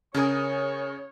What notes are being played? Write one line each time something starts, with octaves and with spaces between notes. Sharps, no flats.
C#3 C#4 G#4 A#4 C#5 C#6 D#6